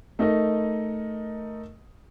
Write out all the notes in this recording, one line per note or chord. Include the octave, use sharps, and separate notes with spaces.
A3 D#4 A#4 D#5